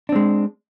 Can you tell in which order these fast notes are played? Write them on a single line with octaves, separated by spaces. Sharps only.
D4 C4 G#3